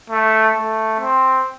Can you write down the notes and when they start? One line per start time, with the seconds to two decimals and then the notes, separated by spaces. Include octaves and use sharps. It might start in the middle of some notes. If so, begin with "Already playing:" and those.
0.10 A3
0.56 A3
1.00 C4